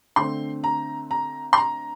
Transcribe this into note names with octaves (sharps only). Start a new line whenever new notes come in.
D3 A3 C4 C6
A#5
A#5
C6
A#5